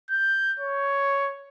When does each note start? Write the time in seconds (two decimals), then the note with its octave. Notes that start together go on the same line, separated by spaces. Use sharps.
0.11 G6
0.60 C#5